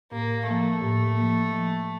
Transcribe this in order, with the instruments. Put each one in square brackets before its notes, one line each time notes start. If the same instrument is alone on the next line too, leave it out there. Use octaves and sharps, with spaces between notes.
[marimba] A2 [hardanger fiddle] A#3
[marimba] F3 A#3 [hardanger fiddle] A3
[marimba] A2
F3 A#3
F3